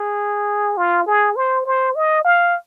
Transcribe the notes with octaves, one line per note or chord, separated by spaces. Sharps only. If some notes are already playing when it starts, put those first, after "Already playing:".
Already playing: G#4
F4
G#4
C5
C5
D#5
F5